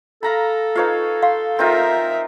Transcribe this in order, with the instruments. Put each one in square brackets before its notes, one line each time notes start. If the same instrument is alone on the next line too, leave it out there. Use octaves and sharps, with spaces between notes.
[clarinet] A4 [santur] F5 A#5 B5
[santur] D#4 C#5 F5 [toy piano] F4 B4
[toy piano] F5 [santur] C6
[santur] C4 D#4 F4 [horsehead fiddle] A#4 E5